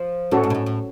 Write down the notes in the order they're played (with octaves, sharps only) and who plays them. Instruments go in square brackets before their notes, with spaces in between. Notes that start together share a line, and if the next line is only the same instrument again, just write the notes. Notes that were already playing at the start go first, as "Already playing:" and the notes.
Already playing: [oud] F3
[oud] A2 [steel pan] C#4 F#4 A4
[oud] G#2
B2
A2
A2